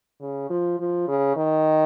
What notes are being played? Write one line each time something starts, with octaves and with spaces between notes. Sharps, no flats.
C#3
F3
F3
C#3
D#3